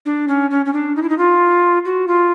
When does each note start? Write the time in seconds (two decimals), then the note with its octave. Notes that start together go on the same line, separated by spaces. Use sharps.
0.05 D4
0.28 C#4
0.50 C#4
0.66 C#4
0.73 D4
0.96 D#4
1.02 E4
1.09 D#4
1.18 F4
1.85 F#4
2.08 F4